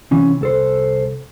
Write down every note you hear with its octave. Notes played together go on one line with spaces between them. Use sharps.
C3 E3 C#4
C2 A4 C5